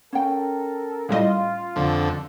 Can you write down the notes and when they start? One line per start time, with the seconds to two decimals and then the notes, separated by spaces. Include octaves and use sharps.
0.13 C#4 A4 A#4 G5
1.09 A2 G3 F4 D#5
1.76 F2 D3